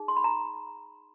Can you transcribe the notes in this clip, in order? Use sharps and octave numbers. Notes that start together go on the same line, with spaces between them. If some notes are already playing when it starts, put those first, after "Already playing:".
Already playing: D#4 G#4
C6
B5
A#5